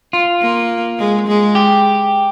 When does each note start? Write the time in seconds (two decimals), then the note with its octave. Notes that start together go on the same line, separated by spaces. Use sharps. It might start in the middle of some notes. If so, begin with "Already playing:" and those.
0.13 F4
0.42 A#3
0.99 G#3
1.28 G#3
1.55 G4